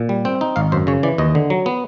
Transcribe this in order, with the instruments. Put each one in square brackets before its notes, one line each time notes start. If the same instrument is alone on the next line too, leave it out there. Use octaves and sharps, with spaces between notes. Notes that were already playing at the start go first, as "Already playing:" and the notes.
Already playing: [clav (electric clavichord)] A#2
G3
C4 G5
D#4
G#1 F5
F#2 C5
C#3 C#5
E3 D5
D#2 D#5
D3
F#3
B3